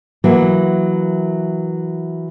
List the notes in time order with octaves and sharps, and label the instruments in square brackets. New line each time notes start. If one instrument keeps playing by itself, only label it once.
[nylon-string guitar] E3 F#3 A#3